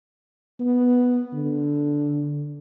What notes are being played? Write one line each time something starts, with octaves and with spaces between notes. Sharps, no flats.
B3
D3